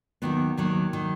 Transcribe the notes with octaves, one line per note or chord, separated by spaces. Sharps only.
D#2 D#3 F#3 B3
D#2 D#3 F#3 A#3
D#3 F#3